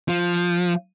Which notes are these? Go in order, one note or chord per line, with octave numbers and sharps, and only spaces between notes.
F3